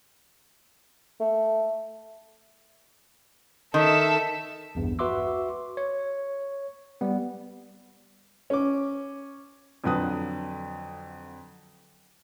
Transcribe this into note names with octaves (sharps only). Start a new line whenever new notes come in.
A3
D#3 A4 E5
A#1 E2 G2
F#4 B4 E5 C6 D6 E6
C#5
G3 B3
C#4 D6
F2 D3 F#3 B4 D#6